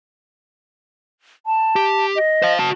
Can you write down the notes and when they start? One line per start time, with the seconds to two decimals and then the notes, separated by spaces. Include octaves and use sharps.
1.46 A5
1.76 G4
2.16 D#5
2.42 C5 F5
2.59 F#4 A5